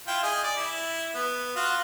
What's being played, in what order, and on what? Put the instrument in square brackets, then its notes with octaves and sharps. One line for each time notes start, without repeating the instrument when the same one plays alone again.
[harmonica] E4 F4 G5
G#4 D#5 G#5
D5
E4
B3
F4 F#4